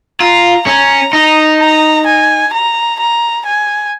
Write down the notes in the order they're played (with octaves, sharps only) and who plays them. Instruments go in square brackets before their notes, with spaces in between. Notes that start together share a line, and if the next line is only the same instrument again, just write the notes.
[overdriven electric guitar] F4 [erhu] A#5
[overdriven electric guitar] C#4 [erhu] A#5
[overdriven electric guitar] D#4 [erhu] A#5
[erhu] A#5
G#5
A#5
A#5
G#5